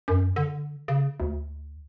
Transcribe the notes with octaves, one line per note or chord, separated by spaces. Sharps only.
F#2
D3
C#3
D2